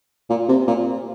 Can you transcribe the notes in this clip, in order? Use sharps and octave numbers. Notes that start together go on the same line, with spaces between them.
A#2
C3
A#2